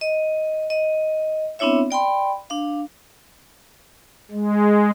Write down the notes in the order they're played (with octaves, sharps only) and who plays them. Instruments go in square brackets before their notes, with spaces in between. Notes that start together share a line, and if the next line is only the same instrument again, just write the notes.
[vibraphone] D#5
D#5
B3 C4 D4 E4 C#5 E5
D5 G5 B5 C6
D4 F5
[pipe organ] G#3